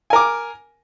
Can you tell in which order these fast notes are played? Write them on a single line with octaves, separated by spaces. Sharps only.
G#5 A#4 D6